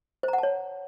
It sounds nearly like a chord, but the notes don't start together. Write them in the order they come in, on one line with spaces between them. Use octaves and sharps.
C5 A#5 F#5 A5 C#5